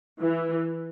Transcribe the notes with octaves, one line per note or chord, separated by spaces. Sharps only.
E3